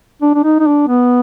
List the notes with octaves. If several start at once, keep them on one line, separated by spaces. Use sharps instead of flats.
D4
D4
D#4
D#4
D4
B3